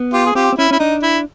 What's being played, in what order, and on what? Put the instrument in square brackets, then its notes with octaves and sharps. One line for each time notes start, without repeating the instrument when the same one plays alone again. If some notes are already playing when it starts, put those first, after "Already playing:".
Already playing: [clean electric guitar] B3
[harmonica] F4 G4
G#4
[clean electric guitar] C4 [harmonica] F4 G4
[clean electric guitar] C4
[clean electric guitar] C#4 [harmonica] E4
[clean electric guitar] C#4 [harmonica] E4
[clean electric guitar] D4 [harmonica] D#4
[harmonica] E4